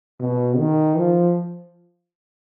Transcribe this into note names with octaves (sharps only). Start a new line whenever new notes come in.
B2
D#3
F3